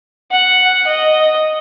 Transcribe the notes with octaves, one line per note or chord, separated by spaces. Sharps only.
F#5
D#5